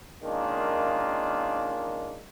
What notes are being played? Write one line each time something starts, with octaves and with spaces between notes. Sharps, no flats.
D#3 G#3 A#3 C#4 D4 F4